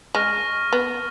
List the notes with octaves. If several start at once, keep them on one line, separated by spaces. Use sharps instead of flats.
G#3 C#6 F6 A#6
B3